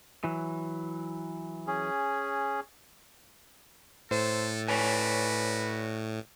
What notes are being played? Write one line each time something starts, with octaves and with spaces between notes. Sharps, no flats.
E3 F#3
C#4 G#4
A2 A4 C5
F#4 B4 C#5 D5 G#5